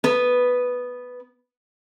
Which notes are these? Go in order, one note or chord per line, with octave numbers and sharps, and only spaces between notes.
B3 B4